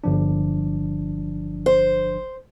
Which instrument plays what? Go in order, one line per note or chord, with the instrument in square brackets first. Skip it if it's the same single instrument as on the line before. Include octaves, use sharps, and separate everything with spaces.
[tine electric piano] G1 F3 D4
[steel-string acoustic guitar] C5